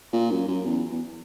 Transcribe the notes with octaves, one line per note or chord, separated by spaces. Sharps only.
A#2
F#2
F#2
E2
E2